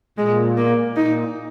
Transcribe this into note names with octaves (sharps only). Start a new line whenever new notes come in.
A#2 G#3
A#3
A#2 D#4